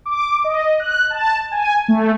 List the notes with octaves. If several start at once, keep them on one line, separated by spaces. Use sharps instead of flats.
D6
D#5
F#6
A5
G#5
A3